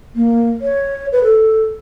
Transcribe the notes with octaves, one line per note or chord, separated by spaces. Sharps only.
A#3
C#5
B4
A4